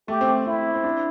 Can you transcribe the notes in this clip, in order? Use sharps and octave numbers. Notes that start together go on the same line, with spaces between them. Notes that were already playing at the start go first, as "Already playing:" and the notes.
A3 G4
C4
A3
C4 E4
C4
D4